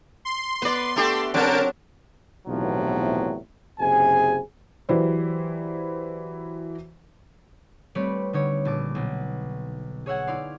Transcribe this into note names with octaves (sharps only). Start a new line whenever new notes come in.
C6
B3 B4 D5
A3 D4 G4
C#3 F#3 C4 D4 A#4 A5 D7
B1 E2 A2 C3 F3 F#3
F#1 C3 G#4 G#5
E3 F#3 E4 G4 C5 D5
G3 A3 C4 B4 C#5 D5
D3 D#4 C#5 D6
A#1 A5 D6
B1
G#4 C#5 E5 F#5 G#5
D#4 E4 D5 F5 C6